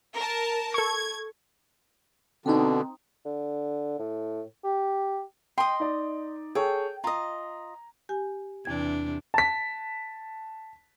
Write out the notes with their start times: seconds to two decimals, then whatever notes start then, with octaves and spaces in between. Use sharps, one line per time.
0.15 A#4 A5
0.74 A4 C#6 G#6
2.46 B2 D3 C4 D#4
3.25 D3
3.99 A2
4.64 G4
5.58 D#5 G5 C6
5.80 D#4 D5
6.55 G#4 A4 C#5 G5
7.04 F4 D#5 A#5
8.09 G4 G#5
8.65 E2 C3 E3 D4 G#6
9.34 A5 B6